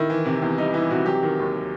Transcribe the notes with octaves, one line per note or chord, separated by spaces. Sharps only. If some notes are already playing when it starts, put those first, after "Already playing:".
Already playing: D#3 E4
E3
C3
E2
G3 D#4
E3 E4
C3 F#4
F#3 G4
D#3
D#2